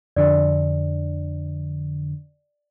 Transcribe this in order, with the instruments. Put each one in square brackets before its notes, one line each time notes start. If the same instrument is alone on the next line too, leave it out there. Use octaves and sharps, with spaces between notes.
[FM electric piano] F2 D3 [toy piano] D5